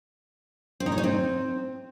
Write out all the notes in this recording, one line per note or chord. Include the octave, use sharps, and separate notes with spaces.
C4
D#4
C#5
D#4
C4